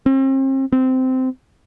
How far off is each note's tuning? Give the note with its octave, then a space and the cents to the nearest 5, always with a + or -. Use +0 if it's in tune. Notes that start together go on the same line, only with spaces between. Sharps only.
C4 +40
C4 -15